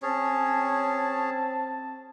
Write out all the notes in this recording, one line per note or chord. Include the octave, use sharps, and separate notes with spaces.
C4 C#4 G#4 C#5 A5